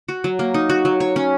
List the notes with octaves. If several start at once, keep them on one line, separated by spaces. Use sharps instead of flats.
F#4
F#3
A#3
D#4
F#4
F#3
C#5
C#4